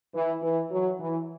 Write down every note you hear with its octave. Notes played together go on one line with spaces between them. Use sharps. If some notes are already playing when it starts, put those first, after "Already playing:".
E3
E3
F#3
E3